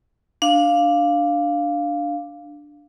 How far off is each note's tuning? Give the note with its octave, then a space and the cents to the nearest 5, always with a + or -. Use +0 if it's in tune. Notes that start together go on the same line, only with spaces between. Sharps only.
D4 +0 F5 +0